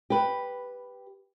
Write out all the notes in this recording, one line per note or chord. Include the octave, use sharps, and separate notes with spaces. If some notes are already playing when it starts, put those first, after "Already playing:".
G4 B4